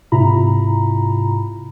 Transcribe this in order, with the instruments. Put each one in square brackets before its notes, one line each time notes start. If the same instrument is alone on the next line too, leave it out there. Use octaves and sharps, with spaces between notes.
[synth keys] G#2 C3 E4 F4 A#5 B5